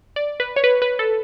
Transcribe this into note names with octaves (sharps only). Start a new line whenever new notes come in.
D5
B4
C#5
B4
B4
A4